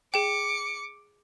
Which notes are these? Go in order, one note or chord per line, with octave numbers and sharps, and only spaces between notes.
G#4 G5 D6 C#7